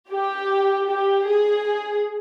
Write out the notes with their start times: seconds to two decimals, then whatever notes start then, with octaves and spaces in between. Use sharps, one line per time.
0.11 G4
0.89 G4
1.27 G#4